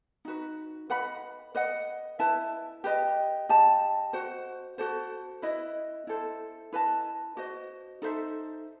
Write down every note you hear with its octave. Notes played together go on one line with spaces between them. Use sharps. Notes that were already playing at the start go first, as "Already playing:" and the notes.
D#4 F#4 B4
B4 D#5 F#5 B5
B4 D#5 F#5
E4 B4 E5 A5
G4 B4 D#5
G4 D#5 A5
F#4 C5 F#5
F#4 A4 C5
E4 B4 D#5
E4 A4 C5
E4 B4 D#5 A5
F#4 C5 D#5
D#4 A4 C5 E5